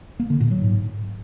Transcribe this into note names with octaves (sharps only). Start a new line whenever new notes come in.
A#3
D3
A#2
F#3
G#2